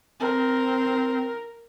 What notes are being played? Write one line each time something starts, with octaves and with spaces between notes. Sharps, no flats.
C4 A#4